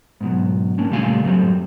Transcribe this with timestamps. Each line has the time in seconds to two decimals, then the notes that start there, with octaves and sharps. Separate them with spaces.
0.21 G#2 B2 F#3
0.78 A#3 C#4 D4
0.90 A#2 C#3 G3 A3 F5 G#5
1.24 F#2 A2 F#3 G3 A3 C4